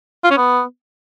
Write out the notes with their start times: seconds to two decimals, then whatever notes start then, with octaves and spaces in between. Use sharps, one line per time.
0.24 F4
0.31 C#4
0.37 B3